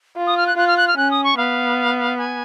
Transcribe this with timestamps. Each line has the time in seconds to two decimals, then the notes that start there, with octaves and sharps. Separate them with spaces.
0.17 F4
0.27 D#6
0.37 F6
0.47 F#6
0.57 F4 F#6
0.67 F6
0.77 F#6
0.88 F6
0.97 C#4 F#6
1.11 D#6
1.24 C#6
1.37 B3 F5
2.18 G#5